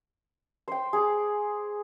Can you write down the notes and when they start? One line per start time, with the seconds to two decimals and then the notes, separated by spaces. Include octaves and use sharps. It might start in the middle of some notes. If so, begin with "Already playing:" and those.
0.68 C5 G5
0.93 G#4 D6